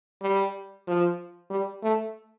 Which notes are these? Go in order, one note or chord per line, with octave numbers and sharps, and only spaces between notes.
G3
F3
G3
A3